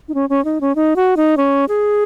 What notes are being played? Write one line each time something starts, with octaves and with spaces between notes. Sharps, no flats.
D#4
C#4
C#4
D#4
C#4
D#4
F#4
D#4
C#4
G#4